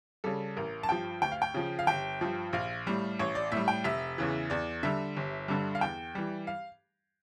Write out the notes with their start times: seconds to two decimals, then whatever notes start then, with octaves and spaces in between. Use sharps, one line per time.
0.24 C#3 G3 A4
0.57 A1 A#4
0.83 A5
0.89 G2 F3 G5
1.22 D2 G5
1.32 F5
1.42 G5
1.54 C#3 F3
1.79 F5
1.87 G1 G5
2.21 G2 F3
2.53 A#1 F5
2.87 A2 G3
3.19 A1 C#5
3.35 D5
3.52 A2 G3 E5
3.68 G5
3.84 F1 E5
4.18 E2 C#3 E3
4.50 E2 D5
4.83 D3 G3 E5
5.17 G1
5.48 G2 D3 G3
5.75 F5
5.81 E2 G5
6.15 E3 G3
6.47 F5